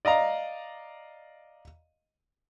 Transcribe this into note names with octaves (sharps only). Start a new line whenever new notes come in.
D5 D#5 F5 A#5